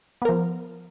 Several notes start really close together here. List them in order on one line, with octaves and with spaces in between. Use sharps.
B3 A#4 F3